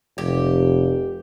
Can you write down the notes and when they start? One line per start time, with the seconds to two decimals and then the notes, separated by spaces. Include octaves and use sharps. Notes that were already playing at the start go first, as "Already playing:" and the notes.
0.18 F1 G4